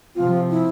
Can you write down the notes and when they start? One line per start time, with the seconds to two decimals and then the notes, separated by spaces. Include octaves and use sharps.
0.15 C3 F3 C4 F4
0.50 E4